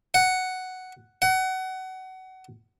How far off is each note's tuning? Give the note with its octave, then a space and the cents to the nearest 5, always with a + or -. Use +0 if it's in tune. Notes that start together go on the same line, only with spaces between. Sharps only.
F#5 +5
F#5 +25